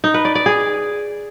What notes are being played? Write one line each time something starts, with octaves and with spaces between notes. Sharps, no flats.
D#4
B4
D5
D5
G#4